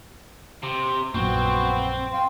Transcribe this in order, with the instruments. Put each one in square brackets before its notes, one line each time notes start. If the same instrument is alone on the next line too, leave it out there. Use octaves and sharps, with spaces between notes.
[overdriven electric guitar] C3
[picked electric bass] A#1 F#2 A#2 [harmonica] B3 F#4 C#6 [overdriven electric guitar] C4
[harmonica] F5 G5 C6